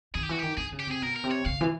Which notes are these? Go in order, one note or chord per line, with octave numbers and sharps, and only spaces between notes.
D#3 G#4
G4
E3 F#4
D#3 G4
D3 G#4
C#3
G4
C3 G#4
B2 A#4
A#4
C3
C#5
C#3 F5
E3